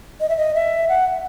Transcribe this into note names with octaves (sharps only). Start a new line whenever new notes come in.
D#5
E5
D#5
E5
F#5